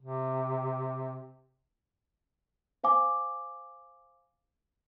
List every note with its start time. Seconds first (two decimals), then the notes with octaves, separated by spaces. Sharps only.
0.01 C3
2.84 C5 F5 G#5 D6